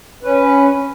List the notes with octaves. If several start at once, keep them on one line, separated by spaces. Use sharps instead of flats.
C#4 B4